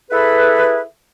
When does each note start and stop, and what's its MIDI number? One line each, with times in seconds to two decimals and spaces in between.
0.11 0.80 64
0.11 0.80 68
0.11 0.80 69
0.11 0.80 71